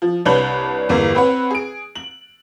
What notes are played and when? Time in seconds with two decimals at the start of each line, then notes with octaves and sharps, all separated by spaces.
0.02 F3
0.26 C2 D4 B4 C#5 G6 F#7
0.89 G1 E2 A#3
1.15 C4 B4 C#5 F#5
1.51 G#4 D7
1.95 F#7